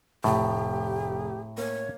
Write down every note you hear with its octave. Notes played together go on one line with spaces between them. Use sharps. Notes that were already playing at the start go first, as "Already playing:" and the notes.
F1 A2 G4
A#3 C#5